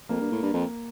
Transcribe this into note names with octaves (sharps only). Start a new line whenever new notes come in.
F2 A#3
G2
A2
G2
F2